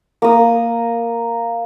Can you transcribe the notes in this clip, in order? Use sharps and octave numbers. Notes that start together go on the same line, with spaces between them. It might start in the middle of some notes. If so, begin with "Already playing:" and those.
A#3 D#6